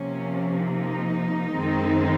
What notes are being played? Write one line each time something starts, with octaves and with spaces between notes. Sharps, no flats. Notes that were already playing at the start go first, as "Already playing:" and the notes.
Already playing: C3 F3 A#3 C#4
D#4
F#2 D#3 G#3 C4